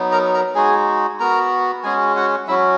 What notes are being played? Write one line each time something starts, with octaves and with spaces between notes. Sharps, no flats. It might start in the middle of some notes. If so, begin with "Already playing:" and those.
Already playing: F#3 B3 D#4
A#4 A#5
A#4 A#5
G#3 D#4 F#4 G#4 G#5
B3 F#4 A#4 A#5
G#3 C#4 F#4 G#4 G#5
F#4 F#5
F#3 C#4 E4 F#4 E5